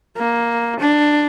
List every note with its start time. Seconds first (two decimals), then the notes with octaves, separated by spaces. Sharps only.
0.17 A#3
0.79 D4